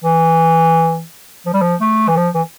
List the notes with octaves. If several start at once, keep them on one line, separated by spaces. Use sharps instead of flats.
E3
F3
G3
F3
A3
E3
F3
E3